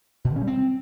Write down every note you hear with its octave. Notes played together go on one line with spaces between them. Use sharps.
B2
D#3
C#4
G3
C4